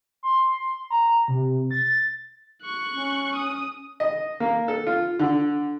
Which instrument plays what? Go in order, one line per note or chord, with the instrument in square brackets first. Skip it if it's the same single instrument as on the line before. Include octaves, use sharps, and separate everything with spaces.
[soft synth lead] C6
A#5
C3
A6
[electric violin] C#6 F#6
[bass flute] C#4
[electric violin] D#6
[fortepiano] D#5
A#3
A4
F4
D3